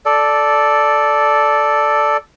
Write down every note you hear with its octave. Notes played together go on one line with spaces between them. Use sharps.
A4 D5